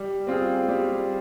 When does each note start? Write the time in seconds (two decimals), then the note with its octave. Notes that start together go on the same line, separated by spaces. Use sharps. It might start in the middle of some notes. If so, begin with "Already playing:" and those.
Already playing: G3
0.27 C4 F4 G#4
0.68 G3